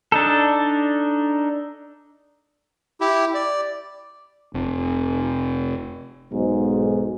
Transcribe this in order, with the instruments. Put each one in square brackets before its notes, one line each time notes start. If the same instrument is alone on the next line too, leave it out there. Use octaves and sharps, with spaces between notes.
[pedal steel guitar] D4 D#4 A4
[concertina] E4 G4
D5
[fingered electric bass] F1 C3
[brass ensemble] B1 G#2